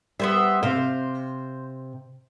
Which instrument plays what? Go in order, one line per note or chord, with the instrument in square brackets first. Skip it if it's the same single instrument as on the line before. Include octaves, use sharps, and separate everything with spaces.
[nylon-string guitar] G3 [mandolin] B3 C5 E5
[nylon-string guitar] C3 F5 [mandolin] C5